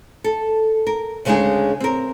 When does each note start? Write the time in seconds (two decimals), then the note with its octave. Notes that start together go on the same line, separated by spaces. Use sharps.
0.24 A4
0.87 A#4
1.25 D2 C#3 G#3 D4 D#4 G#4
1.80 C4 A#4